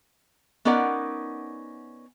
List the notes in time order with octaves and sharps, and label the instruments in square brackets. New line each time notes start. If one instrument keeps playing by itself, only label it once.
[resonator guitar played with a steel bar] B3 C#4 D#4 A#4 D5 F#5